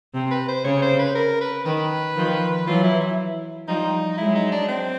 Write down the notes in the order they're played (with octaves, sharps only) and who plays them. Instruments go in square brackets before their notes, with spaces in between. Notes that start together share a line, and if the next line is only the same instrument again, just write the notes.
[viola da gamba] C3
[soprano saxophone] B4
C5
[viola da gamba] C#3 [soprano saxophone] C#5
[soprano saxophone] C5
B4
A#4
B4
[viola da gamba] D#3 [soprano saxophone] B4
[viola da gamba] D#3 F3
[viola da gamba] E3 F#3 [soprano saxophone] F4
[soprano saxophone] E4
E4
[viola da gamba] F3 G3 [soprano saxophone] D#4
[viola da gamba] F#3 G#3 [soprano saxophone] E4
[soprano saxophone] D#4
D4
C4